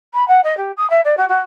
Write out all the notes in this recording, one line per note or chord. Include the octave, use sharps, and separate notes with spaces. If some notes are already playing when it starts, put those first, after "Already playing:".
B5
F#5
D#5
G4
D#6
E5
D5
F#4
F#4